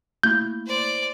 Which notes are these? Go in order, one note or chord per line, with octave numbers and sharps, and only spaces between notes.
A3 A#3 E4 G6
C5 D5